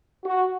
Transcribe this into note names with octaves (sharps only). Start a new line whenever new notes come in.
F#4